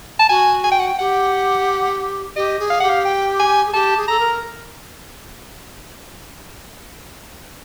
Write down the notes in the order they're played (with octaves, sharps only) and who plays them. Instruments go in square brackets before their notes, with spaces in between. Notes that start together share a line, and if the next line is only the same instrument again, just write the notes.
[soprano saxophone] A5
[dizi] F#4 [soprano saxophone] G#5
[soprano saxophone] G#5
G5
F#5
G5
[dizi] G4 [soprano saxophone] F#5
[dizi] G4 [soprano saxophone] D#5
[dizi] G#4
[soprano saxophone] F5
[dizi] G4 [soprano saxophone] F#5
[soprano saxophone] F5
G5
G#5
[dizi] G#4
[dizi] G4 [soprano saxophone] A5
[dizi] G#4
[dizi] A4 [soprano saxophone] A#5
[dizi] A#4